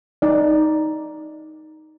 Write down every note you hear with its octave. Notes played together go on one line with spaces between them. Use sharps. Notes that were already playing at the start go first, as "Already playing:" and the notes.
D#4 D5